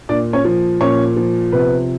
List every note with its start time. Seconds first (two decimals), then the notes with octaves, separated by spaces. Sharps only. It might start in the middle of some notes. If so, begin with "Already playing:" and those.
0.09 A#2 D4 D5
0.33 C#4 C#5
0.45 F3
0.81 A#2 C#4 C#5
1.16 F3
1.52 C3 B3 B4